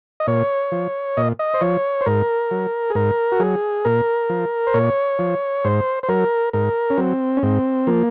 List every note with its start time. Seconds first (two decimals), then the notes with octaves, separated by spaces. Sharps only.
0.20 D#5
0.27 A#2 C#5
0.72 F3
1.17 A#2 D#5
1.39 D#5
1.54 C5
1.61 F3 C#5
2.01 C5
2.06 G#2 A#4
2.51 F#3
2.90 G#4
2.95 G#2 A#4
3.32 F#4
3.40 F#3 G#4
3.85 A#2 A#4
4.30 F3
4.67 C5
4.74 A#2 C#5
5.19 F3
5.65 G#2 C5
6.03 C5
6.09 F#3 A#4
6.53 G#2 A#4
6.90 C#4
6.98 F#3 C4
7.37 C#4
7.43 G#2 C4
7.87 F3 A#3